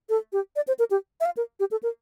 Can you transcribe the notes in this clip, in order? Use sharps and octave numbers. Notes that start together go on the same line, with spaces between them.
A4
G4
D5
C5
A#4
G4
E5
F5
A#4
G4
A4
A#4